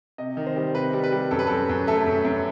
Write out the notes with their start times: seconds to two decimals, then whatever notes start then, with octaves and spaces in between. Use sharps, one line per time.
0.18 C3 D#5
0.37 D#3
0.46 C5
0.56 G3
0.75 C3 B4
0.93 G3
1.04 B4
1.12 G3
1.31 F#2 A4
1.39 B4
1.47 F#2 A4
1.69 F#2
1.87 A3 A4
2.06 F#2
2.25 F#2